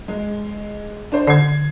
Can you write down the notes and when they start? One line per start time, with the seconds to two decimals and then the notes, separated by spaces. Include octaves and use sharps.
0.08 G#3
1.12 D4 C5
1.27 D3 G#6 C7